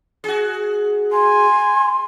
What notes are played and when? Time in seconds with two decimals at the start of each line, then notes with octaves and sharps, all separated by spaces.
0.24 F#4 G#4
1.13 G#5 C6